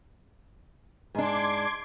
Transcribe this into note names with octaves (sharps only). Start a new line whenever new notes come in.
G#2 D4 C6 D6 G#6